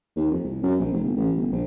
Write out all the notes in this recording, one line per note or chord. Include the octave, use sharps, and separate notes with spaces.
D#2
F2
C2
F#2
A#1
F1
G1
A1
G1
A#1